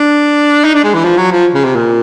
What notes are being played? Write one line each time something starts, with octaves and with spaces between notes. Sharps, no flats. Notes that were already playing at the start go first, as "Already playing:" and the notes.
Already playing: D4
D#4
D4
G#3
E3
F3
F#3
F3
C#3
C3
A#2